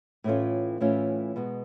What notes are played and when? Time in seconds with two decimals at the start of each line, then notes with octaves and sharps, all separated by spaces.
0.24 A2 E3 A3 C#4 F4
0.80 A2 E3 A3 C#4 F4
1.36 B2 G#3 B3